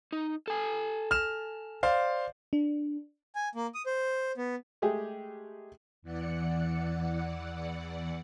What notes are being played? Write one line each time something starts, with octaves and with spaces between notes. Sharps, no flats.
D#4
A4 G#5
F6 E7
C5 D5 F5
D4
G#5
A#3
D#6
C5
B3
G#3 A3 G4 G#4
E2 E3 D5 F#5 C#7